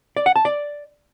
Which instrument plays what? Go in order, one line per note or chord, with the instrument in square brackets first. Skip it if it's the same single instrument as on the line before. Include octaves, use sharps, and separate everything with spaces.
[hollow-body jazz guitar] D5
F#5
A5
D5